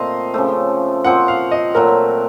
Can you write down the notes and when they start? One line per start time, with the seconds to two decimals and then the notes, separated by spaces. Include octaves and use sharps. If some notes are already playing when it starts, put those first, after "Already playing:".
Already playing: A#2 A3 C4 D#5 F5
0.34 C#3 F3 A3
1.04 A#2 F3 C4 F#4 F#5
1.28 F5
1.51 D#5
1.75 A#2 F#3 A3 A#4